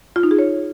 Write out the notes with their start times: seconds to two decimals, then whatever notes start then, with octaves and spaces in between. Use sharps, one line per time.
0.16 F4
0.23 D#4
0.31 G#4
0.39 C#5